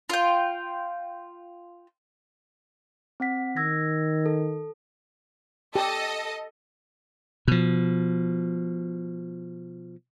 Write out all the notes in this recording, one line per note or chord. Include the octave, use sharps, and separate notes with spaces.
F4 G5
C4 F#5 B6
D#3 E6 G#6 A#6
A4
G4 A4 D#5
B2 F3